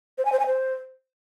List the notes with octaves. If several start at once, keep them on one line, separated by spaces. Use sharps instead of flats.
C5
G#5
C5
G#5
C5